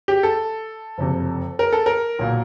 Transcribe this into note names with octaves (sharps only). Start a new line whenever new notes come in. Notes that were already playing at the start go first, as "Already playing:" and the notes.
G4
A4
F#1 F2 C3
A#4
A4
A#4
B1 A#2